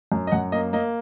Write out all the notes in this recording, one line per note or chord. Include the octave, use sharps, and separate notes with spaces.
F#2
D#5
F#2 F#5
A#3 D#5
A#3 D#5